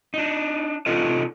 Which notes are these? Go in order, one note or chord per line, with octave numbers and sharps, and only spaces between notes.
D4 D#4
C3 D4 D#4 F4 A4 D#5